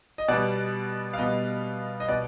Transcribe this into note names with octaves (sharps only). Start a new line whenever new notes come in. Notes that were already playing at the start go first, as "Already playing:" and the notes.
D#5
B2 G3 B3 D5
F5
B2 G3 B3 D#5
D#5
B2 B3 D5